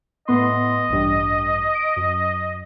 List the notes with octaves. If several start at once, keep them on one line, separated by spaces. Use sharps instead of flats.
A2 B3 D#5 C6
A1 G2
D7
F#2